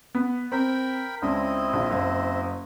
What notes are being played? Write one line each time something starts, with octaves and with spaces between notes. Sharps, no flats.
B3
C4 A#4 G5 B5
C#2 C4 D4 E4 D#5
A#1
F#1